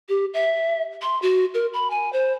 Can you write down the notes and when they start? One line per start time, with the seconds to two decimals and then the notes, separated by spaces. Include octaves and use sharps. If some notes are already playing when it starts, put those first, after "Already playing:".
0.09 G4
0.34 E5
1.02 C6
1.22 F#4
1.54 A#4
1.74 B5
1.90 G#5
2.13 C5